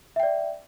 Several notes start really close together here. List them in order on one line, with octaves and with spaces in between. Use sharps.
E5 G5 D5